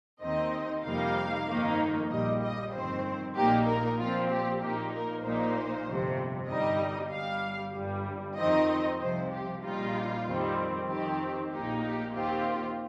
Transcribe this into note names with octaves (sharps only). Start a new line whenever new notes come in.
D#2 D#3 C4 D#4 D#5
F2 C3 G3 A#3 D#4 F5
G1 F2 D#3 A#3 D#4
A#1 A#2 G3 D#5
D#5
G1 F2 D#3 C4 C5
A#1 A#2 A#3 D#4 G4
A#4
A#2 F3 C4 F4
G4
A#1 A#2 A#3 D#4 G4
A#4
A#1 A#2 A#3 D#4 C5
G1 F2 C3
G1 G2 G3 D#4 D#5
G1 G2 G3 F5
G1 G2 G3
F2 D#3 C4 D#4 D#5
C2 C3 F3 C5
G4
A#1 A#2 G3 D#4 F4
F2 D#3 G3 C4
F2 D#3 C4 G4
A#1 A#2 A#3 D#4 G4
G4
D#2 D#3 C4 F4 G4